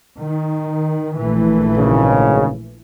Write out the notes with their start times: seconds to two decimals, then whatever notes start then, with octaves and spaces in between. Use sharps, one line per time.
0.19 D#3
1.18 A#1 E3 A3
1.77 G#1 C#3